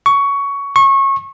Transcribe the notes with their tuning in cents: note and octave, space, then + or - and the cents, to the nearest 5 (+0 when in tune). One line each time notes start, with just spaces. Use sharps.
C#6 +15
C#6 -25